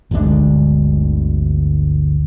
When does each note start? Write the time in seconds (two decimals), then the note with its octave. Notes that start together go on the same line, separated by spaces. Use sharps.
0.11 G1 D2 G#3 D4